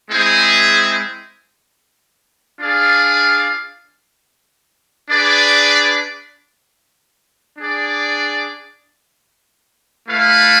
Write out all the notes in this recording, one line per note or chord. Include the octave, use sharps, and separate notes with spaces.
G#3 C4 E4 G#4 C5
D4 F4 G#4 D5 F5
D4 G#4 B4 D5
D4 G#4 D5
A3 E4 B4 F5